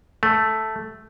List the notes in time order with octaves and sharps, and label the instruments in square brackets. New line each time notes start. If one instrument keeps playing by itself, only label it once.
[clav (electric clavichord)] A3